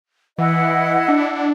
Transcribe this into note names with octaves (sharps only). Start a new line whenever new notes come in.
E3 E4 D#5 F#5
D4